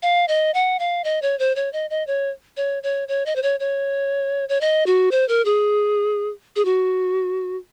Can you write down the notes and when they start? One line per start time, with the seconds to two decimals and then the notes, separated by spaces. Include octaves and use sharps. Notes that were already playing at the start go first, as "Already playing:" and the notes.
0.03 F5
0.28 D#5
0.54 F#5
0.79 F5
1.04 D#5
1.22 C#5
1.39 C5
1.56 C#5
1.73 D#5
1.90 D#5
2.07 C#5
2.57 C#5
2.83 C#5
3.08 C#5
3.26 D#5
3.36 C5
3.43 C#5
3.60 C#5
4.49 C#5
4.61 D#5
4.86 F#4
5.11 C5
5.29 A#4
5.45 G#4
6.56 G#4
6.65 F#4